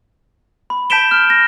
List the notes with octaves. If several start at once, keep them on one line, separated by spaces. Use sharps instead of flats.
B5
A5 G6 B6 D7 E7 G7
F6
A#6